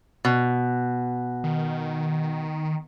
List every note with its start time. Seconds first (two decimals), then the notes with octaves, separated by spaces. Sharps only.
0.25 B2
1.44 D#3